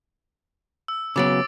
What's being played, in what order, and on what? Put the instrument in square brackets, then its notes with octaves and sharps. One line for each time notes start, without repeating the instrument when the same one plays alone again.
[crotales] E6
[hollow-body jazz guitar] C#3 F#3 B3 [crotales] D6 A6 D7